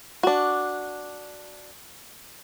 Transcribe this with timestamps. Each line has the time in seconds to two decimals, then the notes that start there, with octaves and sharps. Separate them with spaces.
0.23 D4 F#4